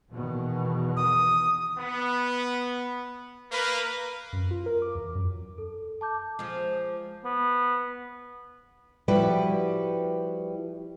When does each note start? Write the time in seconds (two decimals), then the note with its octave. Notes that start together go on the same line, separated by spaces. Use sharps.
0.11 E2 B2 D#3
0.97 D#6
1.78 B3
3.52 A#3 A#4 B4
4.33 F#2
4.51 F4
4.66 A#4
4.82 D6
4.95 E2
5.15 F#2
5.58 A4
6.01 A5 D6 G6
6.39 F3 G#3
7.25 B3
9.08 F3 G3 E4 F#4 G4 B4